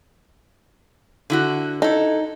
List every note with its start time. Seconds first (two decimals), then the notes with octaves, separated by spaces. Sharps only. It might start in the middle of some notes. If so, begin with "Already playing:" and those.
1.30 D3 E4 F#4
1.82 D#4 E4 A4